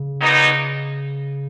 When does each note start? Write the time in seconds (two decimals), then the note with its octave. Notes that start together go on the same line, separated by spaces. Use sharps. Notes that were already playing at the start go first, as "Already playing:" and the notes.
Already playing: C#3
0.21 A#2 F#3 B3 D#4